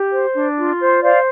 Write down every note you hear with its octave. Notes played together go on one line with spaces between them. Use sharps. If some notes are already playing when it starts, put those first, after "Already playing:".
Already playing: G4
C5
D4
F4
C5
C5 D5 F5